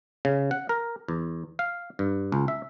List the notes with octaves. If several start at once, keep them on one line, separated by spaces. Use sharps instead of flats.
C#3
F#5
A#4
E2
F5
G2
C#2
E5